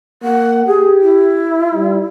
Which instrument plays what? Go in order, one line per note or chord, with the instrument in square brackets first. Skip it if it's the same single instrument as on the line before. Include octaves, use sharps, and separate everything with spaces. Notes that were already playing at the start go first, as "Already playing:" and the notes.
[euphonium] A#3 [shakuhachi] F#5
[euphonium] G4 [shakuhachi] G#4
[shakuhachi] E4
[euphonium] G3